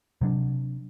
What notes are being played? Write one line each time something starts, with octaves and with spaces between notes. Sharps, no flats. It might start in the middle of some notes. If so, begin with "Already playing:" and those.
C3 F#3 D4